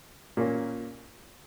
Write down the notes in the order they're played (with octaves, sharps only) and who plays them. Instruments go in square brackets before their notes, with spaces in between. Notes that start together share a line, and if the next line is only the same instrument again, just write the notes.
[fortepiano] A#2 A#3 C#4